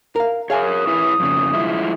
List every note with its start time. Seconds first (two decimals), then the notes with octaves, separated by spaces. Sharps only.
0.16 A#4 F5
0.50 G#4 A#4 C#5 F5 G#5 D#6
0.87 E4 B4 C#5
1.20 F2 C#3
1.53 F3 G#3 E4